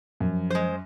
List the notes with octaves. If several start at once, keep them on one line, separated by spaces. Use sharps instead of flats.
F#2 F3
G#3 C5